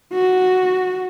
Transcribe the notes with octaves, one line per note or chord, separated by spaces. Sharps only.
F#4